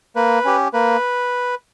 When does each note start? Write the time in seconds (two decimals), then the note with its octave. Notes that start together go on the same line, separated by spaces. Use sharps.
0.16 A#3 B4
0.45 C#4 G4
0.73 A#3 B4